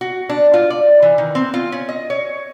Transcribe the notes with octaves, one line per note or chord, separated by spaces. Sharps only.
F#4
D4
F4
D5
E3
D#3
C4
F4
C#4
D#5
C#5